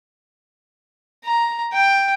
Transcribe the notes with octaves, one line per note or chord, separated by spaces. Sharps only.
A#5
G5